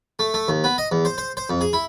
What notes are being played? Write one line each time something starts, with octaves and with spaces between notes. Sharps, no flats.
A3
A3
D#2
B3
D#5
E2
C5
C5
C5
F2
G#4
E4